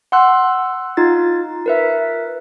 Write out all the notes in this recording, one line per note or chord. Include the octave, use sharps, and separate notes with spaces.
F#5 C6 E6 F#6
D#4 F4 A6
A#4 B4 E5